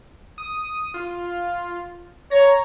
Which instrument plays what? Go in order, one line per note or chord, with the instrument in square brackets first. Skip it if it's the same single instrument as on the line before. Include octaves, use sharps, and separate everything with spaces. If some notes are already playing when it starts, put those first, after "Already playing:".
[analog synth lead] D#6
F4
[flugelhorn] C#5 [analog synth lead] A#5